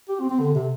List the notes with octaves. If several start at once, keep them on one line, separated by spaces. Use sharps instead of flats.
G4
C4
C4
D3
C3